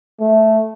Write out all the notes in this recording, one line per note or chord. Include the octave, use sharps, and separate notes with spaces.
A3